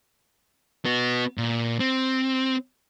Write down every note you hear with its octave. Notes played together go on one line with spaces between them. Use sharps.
B3 F#4
A#2
C4